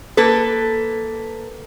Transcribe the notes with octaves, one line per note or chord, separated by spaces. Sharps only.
A#3 A4 B4